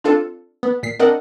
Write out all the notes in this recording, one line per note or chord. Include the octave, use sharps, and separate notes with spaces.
C4 D4 F4 A4
B3
A#2 B6 C7
C4 D4 A#4 D#5 F#5